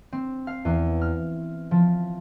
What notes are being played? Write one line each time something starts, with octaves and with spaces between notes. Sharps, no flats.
C4
F5
E2
F6
F3